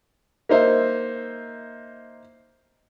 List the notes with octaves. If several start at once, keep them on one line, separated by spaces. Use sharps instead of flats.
A#3 D#4 C5 E5